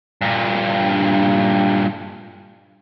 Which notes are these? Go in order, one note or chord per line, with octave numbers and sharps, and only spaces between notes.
G2 A#2